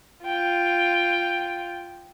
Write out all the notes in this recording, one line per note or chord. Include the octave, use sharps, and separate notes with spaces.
F4 G5